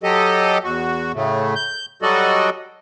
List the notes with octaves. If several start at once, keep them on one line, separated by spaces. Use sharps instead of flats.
F#3 G4 A4 D#5
E2 F#4
A2 C#3 A3
G6
F#3 G3 F#4 A4 D5 D#5